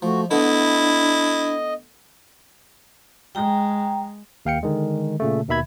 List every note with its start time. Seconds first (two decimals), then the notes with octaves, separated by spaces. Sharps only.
0.02 F3 A3 F#4
0.31 D3 A3 B3 D4 E4 D#5
3.35 G#3 G5 A#5
4.45 D#2 F5 G5 C#7
4.63 D3 D#3 G#3
5.20 A#2 C#3 A3
5.48 D#2 B2 D#3 E5 B5 G#6